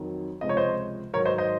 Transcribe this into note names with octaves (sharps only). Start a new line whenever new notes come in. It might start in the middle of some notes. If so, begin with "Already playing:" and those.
Already playing: F2 D#3 F#3
C#2 C3 F3 G#3 D#5
C#5
C5 D#5
G#2 D#3 F#3 A#4 C#5
C5 D#5
C5 D#5